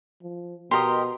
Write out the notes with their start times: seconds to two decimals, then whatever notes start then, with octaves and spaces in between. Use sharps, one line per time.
0.23 F3
0.71 B2 G4 A#4 D#5 C6